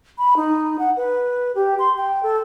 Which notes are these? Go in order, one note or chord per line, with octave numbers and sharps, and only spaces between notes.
B5
D#4
F#5
B4
G4
C6
G5
A4